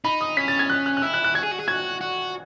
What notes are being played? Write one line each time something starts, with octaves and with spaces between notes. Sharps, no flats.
D#4 B5
D#6
C#4 B6
A6
G#6
F#6
F#6
F#6
E4 E6
F#6
F#6
F#4 G#6
G#4
F#4
G#4
F#4 G#6
F#4